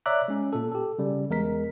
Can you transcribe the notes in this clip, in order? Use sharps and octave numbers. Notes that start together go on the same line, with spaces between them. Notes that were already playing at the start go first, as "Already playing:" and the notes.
C#5 D5 E5 A#5 D6 F#6
G#3 C#4
A#2 A4
G4 A4
C#3 G3
E2 G#3 A#4 B6